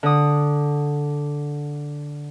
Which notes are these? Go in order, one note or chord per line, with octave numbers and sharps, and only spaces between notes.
D3 D#6